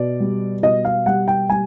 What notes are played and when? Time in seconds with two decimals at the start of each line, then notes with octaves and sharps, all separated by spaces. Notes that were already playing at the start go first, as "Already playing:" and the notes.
Already playing: B2 D5
0.20 G3
0.63 B2 D#5
0.85 F5
1.06 G3 F#5
1.28 G5
1.49 G3 G#5